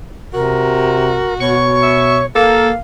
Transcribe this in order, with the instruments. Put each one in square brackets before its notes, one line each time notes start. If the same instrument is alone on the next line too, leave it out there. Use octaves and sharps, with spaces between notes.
[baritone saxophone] C3 [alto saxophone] F#4 [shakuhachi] A#4
[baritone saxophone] B2 [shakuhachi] C#5 [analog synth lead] C#6
[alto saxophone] E5
[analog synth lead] A#3 [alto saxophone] A4 [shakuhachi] F5